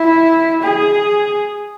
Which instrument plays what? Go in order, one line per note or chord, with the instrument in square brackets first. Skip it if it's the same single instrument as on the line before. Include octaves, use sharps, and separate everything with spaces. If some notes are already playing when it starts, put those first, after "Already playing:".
Already playing: [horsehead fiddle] E4
G#4